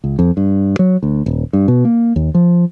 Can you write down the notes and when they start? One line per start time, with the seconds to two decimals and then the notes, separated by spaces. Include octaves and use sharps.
0.04 C#2
0.19 F2
0.37 G2
0.79 F#3
1.03 D2
1.26 D#1
1.53 G2
1.68 B2
1.85 A#3
2.16 D#2
2.35 F3